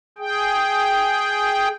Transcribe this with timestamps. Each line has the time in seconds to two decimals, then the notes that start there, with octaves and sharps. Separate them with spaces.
0.18 G#4 G5